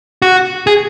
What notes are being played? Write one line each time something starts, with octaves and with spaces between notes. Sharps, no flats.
F#4
G#4